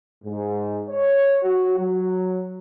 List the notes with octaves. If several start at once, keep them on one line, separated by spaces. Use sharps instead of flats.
G#2
C#5
F#4
F#3